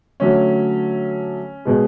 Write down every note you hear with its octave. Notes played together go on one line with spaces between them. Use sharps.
D3 F#3 A3 C#4
B2 G#3